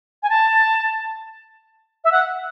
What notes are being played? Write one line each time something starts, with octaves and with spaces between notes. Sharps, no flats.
G#5
A5
E5
F#5